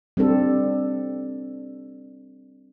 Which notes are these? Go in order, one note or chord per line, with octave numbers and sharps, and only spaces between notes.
G3 C4 D4 A4